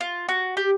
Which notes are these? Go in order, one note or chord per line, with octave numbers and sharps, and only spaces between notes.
F4
F#4
G4